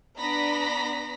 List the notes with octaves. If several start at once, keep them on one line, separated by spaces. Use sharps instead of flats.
B3 D4 A#5 B5 A#6 B6